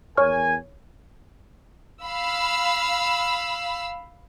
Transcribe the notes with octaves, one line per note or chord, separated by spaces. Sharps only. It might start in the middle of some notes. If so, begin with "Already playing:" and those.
E2 A#4 C#5 G#5 C#6 F6
F5 B5 E6